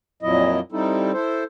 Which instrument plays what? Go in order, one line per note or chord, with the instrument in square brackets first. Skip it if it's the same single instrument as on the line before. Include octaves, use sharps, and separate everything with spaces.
[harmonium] F2 A#2 F#3 E4 D#5
G3 C4 D#4 E4 A4
E4 A4 C5